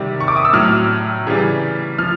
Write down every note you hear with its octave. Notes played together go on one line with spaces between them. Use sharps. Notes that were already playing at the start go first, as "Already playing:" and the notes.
Already playing: C3 D#3 G3
C#6
D6
D#6
E6
A2 F#3 F6
C#3 E3 G3
F3 F6